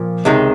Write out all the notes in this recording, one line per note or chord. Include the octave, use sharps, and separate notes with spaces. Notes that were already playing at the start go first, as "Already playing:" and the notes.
Already playing: A#2 F3 A#3
C#2 C3 D#3 G#3